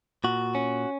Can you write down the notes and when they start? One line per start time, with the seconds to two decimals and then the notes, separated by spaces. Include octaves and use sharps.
0.24 A#2 F#4
0.55 C#4